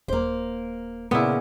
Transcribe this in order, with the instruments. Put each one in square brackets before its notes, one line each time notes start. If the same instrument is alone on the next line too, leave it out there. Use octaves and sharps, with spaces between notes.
[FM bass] D#1 [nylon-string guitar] A#3 C5
[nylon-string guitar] A#2 C#3 [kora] B3 E4